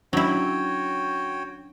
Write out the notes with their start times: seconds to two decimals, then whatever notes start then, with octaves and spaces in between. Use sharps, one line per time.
0.13 F#3 C#4 D4 E4 F#4 C#5 G5